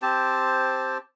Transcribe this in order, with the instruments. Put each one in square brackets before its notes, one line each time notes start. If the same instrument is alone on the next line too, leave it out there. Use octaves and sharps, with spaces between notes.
[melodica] C4 G4 C5 A5